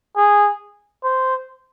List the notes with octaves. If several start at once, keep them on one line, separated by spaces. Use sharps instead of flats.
G#4
C5